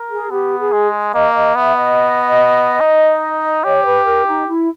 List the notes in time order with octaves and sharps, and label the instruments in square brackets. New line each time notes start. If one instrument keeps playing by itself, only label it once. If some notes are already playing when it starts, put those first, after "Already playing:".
Already playing: [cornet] A#4
[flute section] G#4
[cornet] B3 [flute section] G4
[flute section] G#4
[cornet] G#3
[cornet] A#3 [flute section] D#5
[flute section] D#5
[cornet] B3 [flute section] E5
[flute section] D#5
[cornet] D#4
[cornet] G4 [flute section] C#5
[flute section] B4
A#4
D#4
E4